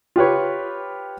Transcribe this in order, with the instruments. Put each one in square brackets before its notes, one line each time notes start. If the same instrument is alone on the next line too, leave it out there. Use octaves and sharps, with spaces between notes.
[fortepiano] F4 G4 B4 C#5